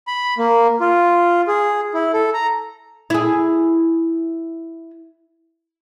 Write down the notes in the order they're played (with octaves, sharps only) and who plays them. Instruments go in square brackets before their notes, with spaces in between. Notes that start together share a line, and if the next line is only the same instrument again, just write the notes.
[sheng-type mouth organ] B5
A#3
F4
G#4
E4
A4
A#5
[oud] E4 G#4